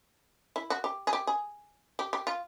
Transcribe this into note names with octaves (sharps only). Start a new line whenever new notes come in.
E4
F#4
G4
G#4
G4
G#4
G4
G4
F4